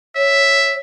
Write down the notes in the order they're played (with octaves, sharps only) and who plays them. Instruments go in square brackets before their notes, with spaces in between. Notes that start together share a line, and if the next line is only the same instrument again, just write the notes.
[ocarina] C#5 [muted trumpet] E5